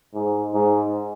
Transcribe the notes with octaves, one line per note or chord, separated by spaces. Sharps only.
G#2
G#2